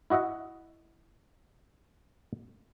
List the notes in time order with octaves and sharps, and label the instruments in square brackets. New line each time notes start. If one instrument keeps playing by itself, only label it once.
[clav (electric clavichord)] E4 F#4 D#5 E5 F#5